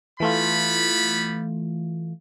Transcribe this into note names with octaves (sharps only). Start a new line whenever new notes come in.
E3 G3 A3 B3 F4 B5